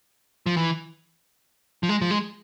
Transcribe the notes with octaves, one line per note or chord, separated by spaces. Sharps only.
F3
E3
F3
G#3
F3
G#3